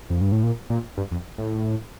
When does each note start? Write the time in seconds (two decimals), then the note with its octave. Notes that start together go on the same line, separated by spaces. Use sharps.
0.10 F2
0.21 G2
0.32 A2
0.43 A#2
0.70 A#2
0.97 G2
1.11 F2
1.38 A2